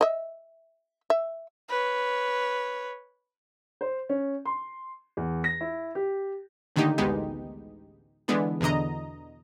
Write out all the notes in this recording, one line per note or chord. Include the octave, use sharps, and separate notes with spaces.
D#5 E5
E5
B4 C#5
C5
C#4
C6
E2
A#6
E4
G4
A2 D3 D#3 A#3 D#4 G4
A1 D2 G#3 B3 D#4 G4
D3 E3 G#3 B3 D4
E2 B2 D3 D#5 A#5